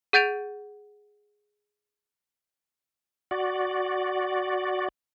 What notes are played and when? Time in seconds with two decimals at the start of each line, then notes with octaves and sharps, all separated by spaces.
0.13 G#4 F#5 G6 A6 D7 F7
3.31 F#4 D5